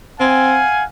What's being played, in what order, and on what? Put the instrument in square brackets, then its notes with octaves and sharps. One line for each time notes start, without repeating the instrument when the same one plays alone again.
[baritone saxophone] C4 [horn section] F5 F#5 G#5